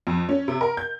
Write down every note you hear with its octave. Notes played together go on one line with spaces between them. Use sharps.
F2
C#4
C3
A#4
G6